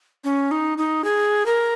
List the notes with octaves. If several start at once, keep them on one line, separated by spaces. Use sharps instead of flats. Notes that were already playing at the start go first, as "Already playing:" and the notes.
C#4
D#4
D#4
G#4
A#4